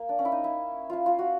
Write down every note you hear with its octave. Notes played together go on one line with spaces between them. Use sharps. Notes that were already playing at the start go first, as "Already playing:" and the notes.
Already playing: A#3
D4
C#4
E4
D#4
E4
E4 F4
F4
F#4